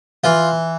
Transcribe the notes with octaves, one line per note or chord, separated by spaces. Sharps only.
E3 F4